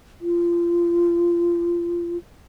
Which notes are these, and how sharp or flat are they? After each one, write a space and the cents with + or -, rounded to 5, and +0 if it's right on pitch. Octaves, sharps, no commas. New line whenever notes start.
F4 -25